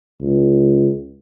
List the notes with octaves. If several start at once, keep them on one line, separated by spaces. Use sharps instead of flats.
C#2